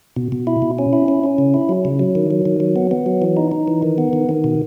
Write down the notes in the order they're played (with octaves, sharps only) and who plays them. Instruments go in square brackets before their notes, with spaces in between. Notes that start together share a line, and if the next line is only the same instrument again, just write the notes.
[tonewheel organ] B2
B2
E4
B2
C#4
E4
C#4
C#4
C#3
E4
F#3
C#3
F#3
D#3
F#3
D#3
F#3
B3
B3
F#3
E3
D#4
D#4
E3
D#3
B3
D#3
D#3
B2